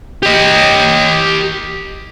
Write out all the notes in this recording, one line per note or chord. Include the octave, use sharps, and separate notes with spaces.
G4 D#5